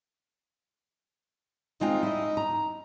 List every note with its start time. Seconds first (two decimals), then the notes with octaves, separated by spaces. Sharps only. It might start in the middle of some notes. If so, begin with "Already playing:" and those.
1.81 G#3 C4 D#4 F4
2.03 E4 D#5
2.37 A#5